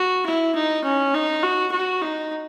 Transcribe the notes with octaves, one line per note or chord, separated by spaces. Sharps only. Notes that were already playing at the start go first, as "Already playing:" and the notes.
Already playing: F#4
E4
D#4
C#4
D#4
F#4
F#4
D#4